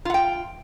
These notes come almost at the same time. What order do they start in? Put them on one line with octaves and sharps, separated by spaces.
F4 F#5 G5